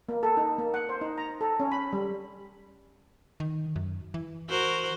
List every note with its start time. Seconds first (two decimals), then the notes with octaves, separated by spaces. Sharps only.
0.09 A#3
0.23 A4
0.37 D#4
0.58 A#3
0.74 F#5
0.89 C5
1.01 D#4
1.18 A#5
1.41 A4
1.60 C#4
1.72 B5
1.93 G3
3.40 D#3
3.76 F#2
4.14 E3
4.50 F#4 A#4 C5